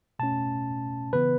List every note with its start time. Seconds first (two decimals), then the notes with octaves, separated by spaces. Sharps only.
0.19 B2 A3 C#4 A5
1.13 C#3 E3 B3 B4